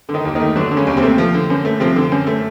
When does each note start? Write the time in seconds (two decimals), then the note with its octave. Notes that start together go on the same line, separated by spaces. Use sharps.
0.09 D3
0.14 D#3 D#4
0.25 D#2
0.35 D#3 A3 D#4
0.56 D3 F#3 D4
0.71 D3
0.76 C#3 C#4
0.87 D#2
0.97 C3 C4
1.03 A3
1.18 F3
1.34 D3
1.50 F#2
1.65 A3
1.80 C3 F3 C4
1.96 D3
2.12 F#2
2.27 A3